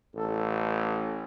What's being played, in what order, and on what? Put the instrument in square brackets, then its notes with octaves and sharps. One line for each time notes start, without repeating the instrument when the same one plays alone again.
[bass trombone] A1 [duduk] A4